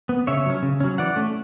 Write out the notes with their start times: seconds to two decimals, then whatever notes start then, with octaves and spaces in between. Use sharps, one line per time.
0.09 B3
0.27 C#3 C#5 E5
0.46 F#3 C#4
0.63 C#3
0.80 F#3 C#4
0.98 E3 D5 F#5
1.16 A3 C#4